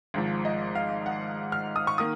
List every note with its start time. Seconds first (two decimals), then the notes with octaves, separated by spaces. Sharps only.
0.14 G#1 G#2 F3
0.45 D#5
0.75 F5
1.06 F#5
1.52 F6
1.76 D#6
1.87 C#6
1.98 D#3 A#3 D#6